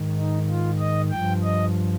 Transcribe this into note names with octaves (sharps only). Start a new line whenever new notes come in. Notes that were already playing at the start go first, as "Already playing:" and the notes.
Already playing: G#2 D#3
D#4
F4
D#5
G2 F3 G5
D#5